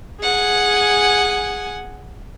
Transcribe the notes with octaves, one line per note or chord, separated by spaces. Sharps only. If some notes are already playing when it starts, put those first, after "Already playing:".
G#4 F#5 G#5